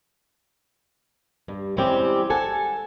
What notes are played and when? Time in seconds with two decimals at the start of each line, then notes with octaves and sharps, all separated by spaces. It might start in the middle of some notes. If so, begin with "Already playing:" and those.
1.48 G2
1.77 E3 G3 G#3 C4 C#4 G4
2.30 A4 F#5 G#5 A5